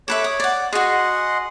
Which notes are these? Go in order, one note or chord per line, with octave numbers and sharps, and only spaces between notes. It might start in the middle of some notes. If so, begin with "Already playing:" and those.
A4 B4 C#5 E5 D6
D#6
D5 F#5
F#4 G#4 D#5 F#5 C6